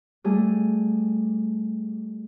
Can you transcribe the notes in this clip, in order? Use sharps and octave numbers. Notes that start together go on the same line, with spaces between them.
G3 A3 G#4